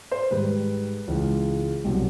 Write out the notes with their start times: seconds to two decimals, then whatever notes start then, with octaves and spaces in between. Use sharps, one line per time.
0.12 C5
0.31 G#2 D#3 G3 B4
1.08 C#2 C#3 E3 G#3
1.84 C2 B2 F#3